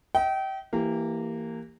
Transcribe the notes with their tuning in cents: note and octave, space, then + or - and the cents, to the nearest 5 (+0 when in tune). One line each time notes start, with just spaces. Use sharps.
D#5 +45 G5 -30
E3 +0 A#3 -20 G4 +0